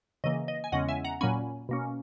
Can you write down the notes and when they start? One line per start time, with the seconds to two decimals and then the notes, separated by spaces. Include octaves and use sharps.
0.24 C#3 E3 A#3 D#5
0.48 D#5
0.64 G#5
0.72 E2 C#3 G#3 C#4 D#5 F#5
0.89 E5 G#5
1.04 F#5 A#5
1.21 A#2 F#3 A#3 C#4 G#5 B5
1.69 B2 A#3 C#4